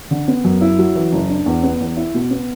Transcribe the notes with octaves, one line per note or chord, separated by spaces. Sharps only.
D3
B3
F#2
E4
F#3
E3
F#1
D4
E2
B3
E2
E4
B2
B3